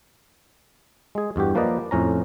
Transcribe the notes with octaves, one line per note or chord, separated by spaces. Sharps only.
G#3 G#4
E2 G2 F#4 G4
F3 A#3 B4 D5 D#5
F2 A2 C#4 A#5